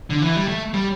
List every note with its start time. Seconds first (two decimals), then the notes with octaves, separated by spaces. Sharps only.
0.10 D3
0.22 E3
0.36 G3
0.48 A3
0.74 G3